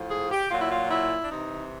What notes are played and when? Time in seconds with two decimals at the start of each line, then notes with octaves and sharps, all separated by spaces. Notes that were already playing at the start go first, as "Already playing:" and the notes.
Already playing: A2 F3
0.11 G#4
0.32 G4
0.51 A#2 F#3 F4
0.61 E4
0.72 F4
0.91 E4
1.22 D4
1.31 C3 E3 D#4